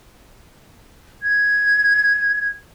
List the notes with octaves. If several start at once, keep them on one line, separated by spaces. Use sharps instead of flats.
G#6